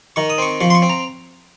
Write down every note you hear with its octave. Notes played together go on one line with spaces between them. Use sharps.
D#3 C#6
D#6
C4 C#6
F3 C#6
C6
C#6
C4
A#5